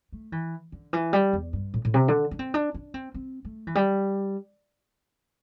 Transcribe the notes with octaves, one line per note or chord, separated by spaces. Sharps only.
A3
E3
D3
E3
G3
E2
G2
A2
A2
C3
D3
D4
C4
D4
D4
C4
C4
A3
E3
G3